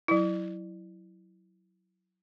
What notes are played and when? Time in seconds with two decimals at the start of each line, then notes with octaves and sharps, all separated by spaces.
0.08 F#3 E4